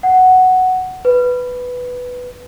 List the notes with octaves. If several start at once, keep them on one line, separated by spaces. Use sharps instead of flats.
F#5
B4